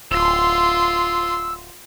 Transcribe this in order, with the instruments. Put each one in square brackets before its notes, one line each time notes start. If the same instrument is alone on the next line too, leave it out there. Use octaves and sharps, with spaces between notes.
[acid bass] D1 [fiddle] F4 C6 [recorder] E6